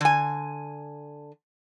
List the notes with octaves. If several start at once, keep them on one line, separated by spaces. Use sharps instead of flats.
D3 G#5